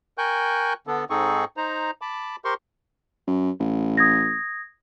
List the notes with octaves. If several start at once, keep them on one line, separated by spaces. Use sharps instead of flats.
A#4 G5 G#5 C#6 F#6 G6
D3 B3 D4 A4
G#2 C4 D#4 G#4 A4 C#6
D#4 C5 A#5
A5 B5 D6
G4 A#4 C5 C6 C#6
F#2
A1
D#6 G#6 A#6